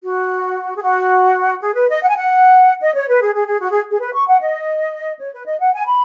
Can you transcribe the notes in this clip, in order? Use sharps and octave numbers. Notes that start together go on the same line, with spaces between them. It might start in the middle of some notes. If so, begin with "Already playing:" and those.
F#4
G#4
F#4
G#4
B4
D#5
F#5
G#5
F#5
D#5
C#5
B4
G#4
G#4
G#4
F#4
G#4
G#4
B4
C#6
F#5
D#5
C#5
B4
D#5
F#5
G#5
B5